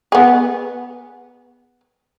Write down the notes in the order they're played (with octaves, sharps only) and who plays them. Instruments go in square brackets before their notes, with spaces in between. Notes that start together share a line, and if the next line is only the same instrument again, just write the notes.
[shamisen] B3 G#4